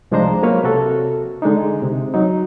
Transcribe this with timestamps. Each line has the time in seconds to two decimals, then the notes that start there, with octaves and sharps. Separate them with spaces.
0.11 C2 F3 G#3 D4 C5 A#5
0.43 F#3 A#3 B4 C#5 F6
0.64 C3 F#4 A4
1.42 D3 G#3 D4 D#4
1.82 C3
2.14 F#3 D#4